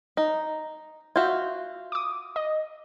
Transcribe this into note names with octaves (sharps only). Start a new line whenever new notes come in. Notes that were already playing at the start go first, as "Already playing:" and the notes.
D#4
F4 F#4 E5 G6
D6 D#6
D#5